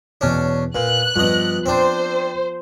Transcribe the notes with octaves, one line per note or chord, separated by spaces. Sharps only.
E2 B2 C#4 D4 C#5
A#2 B4 F#6
G2 F3 B3 D#5
C4 D4 C5